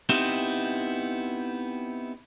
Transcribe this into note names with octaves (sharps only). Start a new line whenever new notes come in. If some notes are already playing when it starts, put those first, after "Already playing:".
B3 C4 D#4 E4 G4